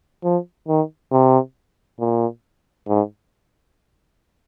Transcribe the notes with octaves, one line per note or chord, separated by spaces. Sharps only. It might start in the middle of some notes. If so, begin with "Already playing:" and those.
F3
D#3
C3
A#2
G#2